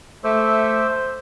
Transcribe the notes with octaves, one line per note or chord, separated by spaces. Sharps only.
A3 C5 E5 D6 E6